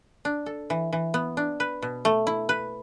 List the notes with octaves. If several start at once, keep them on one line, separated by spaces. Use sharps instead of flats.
D4
A4
E3
E3
B3
D4
B4
B2
A3
E4
B4